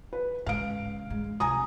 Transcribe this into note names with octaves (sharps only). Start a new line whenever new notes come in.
B4
G#2 C#3 F5 D7
G#3
C2 C3 G#5 A#5 D#6